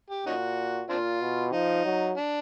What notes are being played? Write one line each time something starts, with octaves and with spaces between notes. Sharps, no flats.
G4
A#2 C#4 D#4 F#4
A#2 C4 D4 F4
B2
F3 D#4
F#3
D4